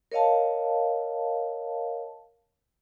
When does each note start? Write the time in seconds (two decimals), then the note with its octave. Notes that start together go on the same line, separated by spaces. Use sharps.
0.12 A#4 C#5 D#5 F5 A5